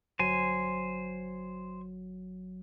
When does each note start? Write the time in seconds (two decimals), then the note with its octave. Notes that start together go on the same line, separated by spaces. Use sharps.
0.19 G1 F#3 C5 G#5